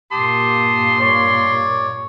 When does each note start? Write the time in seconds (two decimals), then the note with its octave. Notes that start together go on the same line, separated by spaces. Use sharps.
0.11 G2 A#2 G4 A5 C6 D#6
0.99 C#5 D5